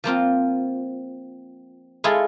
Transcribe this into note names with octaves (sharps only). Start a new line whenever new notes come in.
F3 A#3 C4 F4
G#3 E4 F4 G#4 A4